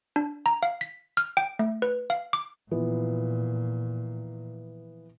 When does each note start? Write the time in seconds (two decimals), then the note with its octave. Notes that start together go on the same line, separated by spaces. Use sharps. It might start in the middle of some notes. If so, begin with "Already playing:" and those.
0.16 D4
0.46 A#5
0.63 F5
0.81 B6
1.17 F6
1.37 G5
1.59 A3
1.82 B4
2.10 F5
2.33 D6
2.71 A#2 E3 F3 B3